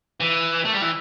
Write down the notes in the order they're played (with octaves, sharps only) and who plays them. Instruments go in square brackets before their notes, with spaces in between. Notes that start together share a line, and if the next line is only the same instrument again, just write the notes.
[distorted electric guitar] E3
A3
G3
E3